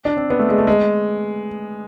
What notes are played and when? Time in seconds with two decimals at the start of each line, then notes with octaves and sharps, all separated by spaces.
0.05 D4
0.17 C4
0.30 B3
0.39 A3
0.49 G#3
0.58 A3
0.67 G#3